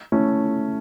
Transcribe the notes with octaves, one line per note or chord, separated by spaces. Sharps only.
A3 C#4 E4